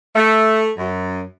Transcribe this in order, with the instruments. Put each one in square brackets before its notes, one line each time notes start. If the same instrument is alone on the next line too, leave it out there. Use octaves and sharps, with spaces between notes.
[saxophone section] A3
F#2